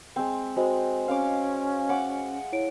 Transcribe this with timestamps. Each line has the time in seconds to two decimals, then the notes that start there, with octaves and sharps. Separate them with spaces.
0.16 G#3 C4
0.56 G#3 F#4 C5 D#5
1.08 C#4 F5 C#6 D6
1.89 F#5 D6
2.52 E4 C#5 D7